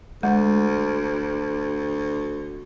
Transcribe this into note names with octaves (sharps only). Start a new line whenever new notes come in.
D2 G#3